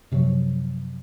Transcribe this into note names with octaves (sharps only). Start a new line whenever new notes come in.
F#2 C3 F3 F#3